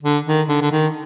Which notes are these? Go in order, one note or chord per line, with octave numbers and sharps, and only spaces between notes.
D3
D#3
D3
D3
D#3